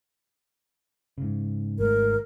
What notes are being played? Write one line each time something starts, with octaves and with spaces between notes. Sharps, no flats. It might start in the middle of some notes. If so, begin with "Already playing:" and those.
G#2 C#3
G#1 G#2 A3 A#4